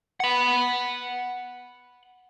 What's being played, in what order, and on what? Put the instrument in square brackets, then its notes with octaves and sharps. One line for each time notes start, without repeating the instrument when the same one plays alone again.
[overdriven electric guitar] F#5 B5